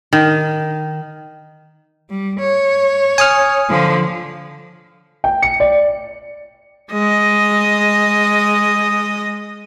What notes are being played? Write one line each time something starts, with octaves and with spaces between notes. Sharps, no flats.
D#3
G3
C#5
G#5 D#6 F6
D3 F3
G5
C#7
D5
G#3 D#5